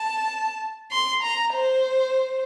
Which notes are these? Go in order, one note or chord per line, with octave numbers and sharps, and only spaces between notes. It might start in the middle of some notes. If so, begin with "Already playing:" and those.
Already playing: A5
C6
A#5
C5